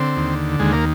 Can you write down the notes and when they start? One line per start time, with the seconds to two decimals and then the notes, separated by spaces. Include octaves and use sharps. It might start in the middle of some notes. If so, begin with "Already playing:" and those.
Already playing: D3 C4
0.17 D#2
0.60 D#2 G#3
0.73 A#3